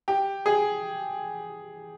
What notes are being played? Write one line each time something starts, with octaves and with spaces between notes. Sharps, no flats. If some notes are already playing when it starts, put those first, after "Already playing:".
G4
G#4